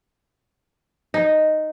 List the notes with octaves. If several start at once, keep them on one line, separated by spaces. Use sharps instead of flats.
D#4